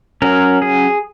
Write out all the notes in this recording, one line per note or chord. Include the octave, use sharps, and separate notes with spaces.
F#3 C#4 A#4
G#4